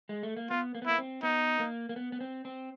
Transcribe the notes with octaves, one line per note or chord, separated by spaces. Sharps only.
G#3
A3
A#3
B3 F4
A#3
B3
A#3 E4
C4
B3 D#4
A#3
A#3
B3
B3
C4
C4